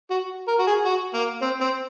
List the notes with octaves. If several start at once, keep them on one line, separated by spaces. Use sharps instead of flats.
F#4
A#4
F#4
G#4
F#4
A#3
C4
C4